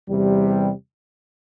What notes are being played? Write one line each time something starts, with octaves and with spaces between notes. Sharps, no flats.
E2 C3 G3